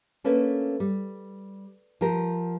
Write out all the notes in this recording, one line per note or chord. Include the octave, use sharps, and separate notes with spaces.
A3 A#3 C#4 D4 B4
G3
F3 G4 A#4